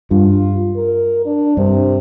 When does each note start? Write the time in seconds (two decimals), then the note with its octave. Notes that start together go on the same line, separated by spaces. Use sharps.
0.11 G2 F4
0.76 A#4
1.26 D4
1.57 G2 C3